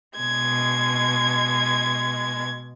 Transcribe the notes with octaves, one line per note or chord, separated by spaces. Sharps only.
B2 G#3 G#6